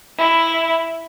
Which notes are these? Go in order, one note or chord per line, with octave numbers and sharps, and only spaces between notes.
E4